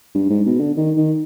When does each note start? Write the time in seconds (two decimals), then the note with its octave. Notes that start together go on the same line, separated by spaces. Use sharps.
0.15 G2
0.30 G#2
0.46 B2
0.60 D3
0.77 D#3
0.97 D#3